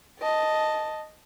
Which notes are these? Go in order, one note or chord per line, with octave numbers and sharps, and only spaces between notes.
D#5 A5